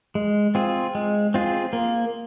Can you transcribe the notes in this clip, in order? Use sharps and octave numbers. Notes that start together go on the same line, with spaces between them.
G#3
C4 F4 G#4
G#3
C4 F4 G#4
A#3